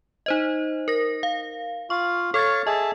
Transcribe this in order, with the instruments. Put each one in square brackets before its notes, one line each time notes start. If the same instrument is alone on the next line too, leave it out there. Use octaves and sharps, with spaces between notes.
[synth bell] D#4 C5 D#5
A#4 A#6
F5
[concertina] F4 F5 [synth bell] C#6
[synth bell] A4 G#6 A6 [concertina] C#5 F5 C#6
[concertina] G#4 E5 A5 [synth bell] D#5